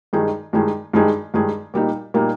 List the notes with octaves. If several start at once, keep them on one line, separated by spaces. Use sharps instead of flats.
G2 D#3 G#3 D#4 G#4
G2 D#3 G#3 D#4 G#4
G2 D#3 G#3 D#4 G#4
G2 D#3 G#3 D#4 G#4
A#2 G3 A#3 D#4
A#2 G3 A#3 D#4